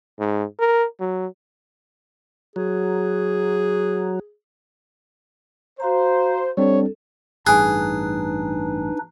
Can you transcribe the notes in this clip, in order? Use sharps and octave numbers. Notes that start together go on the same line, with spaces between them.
G#2
A#4
F#3
F#3 G#4
F#4 C5 F5 A#5
G3 C4 D4 A4 C#5
A1 G2 D4 D#4 G#4 B4 G#5 F#6